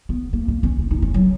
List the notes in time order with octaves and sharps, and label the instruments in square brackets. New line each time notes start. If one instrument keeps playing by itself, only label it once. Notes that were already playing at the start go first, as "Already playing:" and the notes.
[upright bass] B3
A#3
A#3
C#4
C#4
D#4
C#4
F#3